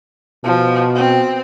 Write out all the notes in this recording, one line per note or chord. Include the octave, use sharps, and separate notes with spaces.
B2 F3
C4